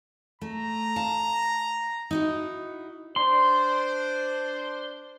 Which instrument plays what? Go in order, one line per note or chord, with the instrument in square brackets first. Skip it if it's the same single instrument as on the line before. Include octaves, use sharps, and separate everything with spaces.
[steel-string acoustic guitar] A3 [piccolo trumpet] A#5
[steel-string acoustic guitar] F5 A5
D#4 E4 F#4
[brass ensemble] D4 C5 [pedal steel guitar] C6